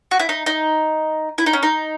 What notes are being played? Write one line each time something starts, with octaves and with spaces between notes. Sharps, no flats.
F#4
E4
D#4
D#4
E4
D#4
C#4
D#4